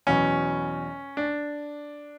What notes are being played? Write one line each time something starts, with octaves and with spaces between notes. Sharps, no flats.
E2 B2 F#3 C#4
D4